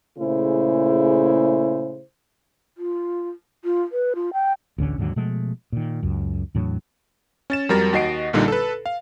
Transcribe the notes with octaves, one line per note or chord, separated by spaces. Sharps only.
A#2 C#3 A3 E4 G#4 C5
F4
F4
B4
F4
G5
A1 D2 D3 C#4
D#2 G#2 D3 F#3
B2 F3 G#3 A3
A#2 D#3
C#2 F#2
E2 A2 F#3 D4
C#4 A6 E7
F2 F#3 G3 A#4 A6 A#6
D#2 F#4 D#5 C7 D7
A#1 A#2 D3 G3 D#4
A4 B4
F5